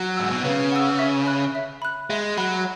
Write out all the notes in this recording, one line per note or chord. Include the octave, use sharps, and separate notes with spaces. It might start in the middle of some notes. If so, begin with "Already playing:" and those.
Already playing: F#3
G#2 F#5 E6
B2
C#3 B4
F#5 E6
E5
B5 F#6
E5
B5 F#6
G#3 E5
F#3 B5 F#6